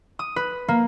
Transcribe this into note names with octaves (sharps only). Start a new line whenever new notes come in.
D#6
B4
A#3